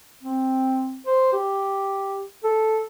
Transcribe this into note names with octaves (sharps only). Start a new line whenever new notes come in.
C4
C5
G4
A4